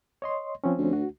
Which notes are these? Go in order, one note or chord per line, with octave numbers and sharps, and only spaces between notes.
C#5 D#5 C6
F3 C4 C#4
D2
F#4